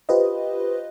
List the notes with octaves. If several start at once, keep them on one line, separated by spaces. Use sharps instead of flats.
F4 G4 B4 C5 D#5